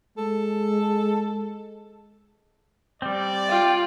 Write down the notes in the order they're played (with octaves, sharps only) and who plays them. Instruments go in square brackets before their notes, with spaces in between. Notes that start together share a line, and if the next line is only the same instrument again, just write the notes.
[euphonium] G#3 [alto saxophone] A4
[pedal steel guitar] G3 C4 [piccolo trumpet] D5
[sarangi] F4 [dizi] G5